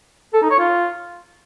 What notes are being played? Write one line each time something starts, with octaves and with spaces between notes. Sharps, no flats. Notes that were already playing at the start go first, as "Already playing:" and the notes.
A4
D#4
C#5
F4